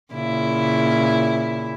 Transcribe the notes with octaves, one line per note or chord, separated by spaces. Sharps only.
A#2 C#3 E4